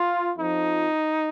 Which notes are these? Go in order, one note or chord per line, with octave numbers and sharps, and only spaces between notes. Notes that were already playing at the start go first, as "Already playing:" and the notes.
Already playing: F4
F2 F3 D#4